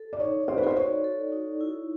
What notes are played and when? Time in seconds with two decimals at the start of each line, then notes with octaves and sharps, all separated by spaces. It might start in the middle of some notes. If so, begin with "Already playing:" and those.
Already playing: A4
0.13 D5
0.19 D#4 C#5
0.48 C5 D5
0.58 B4
0.67 C5
0.76 F#4 C#5
1.04 A4
1.32 D#4
1.61 E4